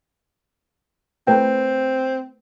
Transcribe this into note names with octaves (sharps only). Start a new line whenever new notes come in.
A3 C4 B4 G5